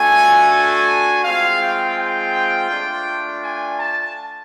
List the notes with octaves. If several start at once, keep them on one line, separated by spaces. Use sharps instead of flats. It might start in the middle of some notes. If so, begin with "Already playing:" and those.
Already playing: A3 D4 F#4 G#5
G#5
G#3 C4 F4 F5
G5
G5
A3 D4 F4
G#5
A5